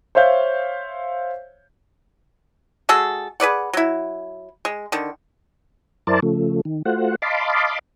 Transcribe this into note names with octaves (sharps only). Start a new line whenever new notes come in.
C5 C#5 E5 F5 G6
G#3 F#4 G#4 A4
G#4 B4 D5 F#5
F#3 E4
G#3
D3 D#3
F#2 E4 A#4 C5 D5 A5
C#3 F3 A3
D#3
A3 F4 F#4 C5 F#5
D#5 F5 A5 B5 C6 D6